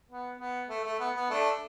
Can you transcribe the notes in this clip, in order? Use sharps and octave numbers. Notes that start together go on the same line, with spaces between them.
B3
B3
A3
A3
B3
B3
A3 D4